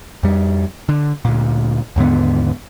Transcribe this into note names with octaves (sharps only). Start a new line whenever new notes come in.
F2 G3
D3
D2 A#2
D#2 G#2 D3 B3